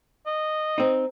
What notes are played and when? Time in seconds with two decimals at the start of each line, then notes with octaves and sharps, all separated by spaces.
0.26 D#5
0.78 C4 D#4